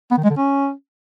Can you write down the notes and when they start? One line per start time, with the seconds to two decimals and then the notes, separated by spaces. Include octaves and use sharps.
0.11 B3
0.17 D#3
0.24 G#3
0.30 D3
0.36 C#4